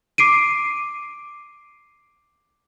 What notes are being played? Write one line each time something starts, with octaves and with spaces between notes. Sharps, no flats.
D6 C7 D7 D#7